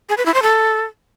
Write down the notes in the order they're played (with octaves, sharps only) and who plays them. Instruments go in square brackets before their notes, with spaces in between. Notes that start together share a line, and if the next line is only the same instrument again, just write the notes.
[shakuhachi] G#4
B4
E4
C5
A4